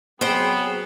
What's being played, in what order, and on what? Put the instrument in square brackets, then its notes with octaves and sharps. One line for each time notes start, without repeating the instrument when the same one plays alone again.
[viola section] F#3 G#4 [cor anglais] B3 [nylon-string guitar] C4 [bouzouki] C5 G5